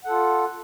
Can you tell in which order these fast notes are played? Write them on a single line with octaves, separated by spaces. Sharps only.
F#5 A4 F4